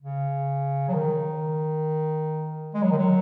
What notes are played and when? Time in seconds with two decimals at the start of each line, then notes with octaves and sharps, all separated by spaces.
0.02 C#3
0.89 F#3
0.94 D#3
2.75 G#3
2.82 F#3
2.91 D#3
2.98 F#3